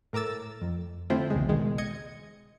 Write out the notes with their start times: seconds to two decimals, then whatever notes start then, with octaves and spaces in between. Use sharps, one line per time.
0.13 A2 A#4 D6 E6 A6
0.61 F2
1.10 D3 A3 C4 E4 F4 C5
1.30 B1 E2 C#3 G#3
1.49 B2 D#3 G#3
1.78 D#5 G#6 C#7